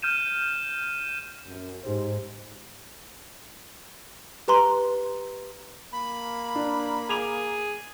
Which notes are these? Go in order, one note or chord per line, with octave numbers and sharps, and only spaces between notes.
F6 G6 D#7 E7
F#2
G#2 D#4 G4 C5
G4 B4 A#5 C6
A#3 B5
D4
G#4 D6 F7